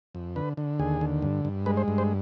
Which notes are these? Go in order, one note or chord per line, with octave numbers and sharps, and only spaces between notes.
F2
D3 B4
D3
D#2 G#4
D3
G2
G2
G#3 B4
C5
G2
C5